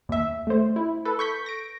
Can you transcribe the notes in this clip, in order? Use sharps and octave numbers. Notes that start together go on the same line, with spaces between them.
D#2 E5
A3 C5
E4
A4 B4
C#6 G6 B6
A#6 D7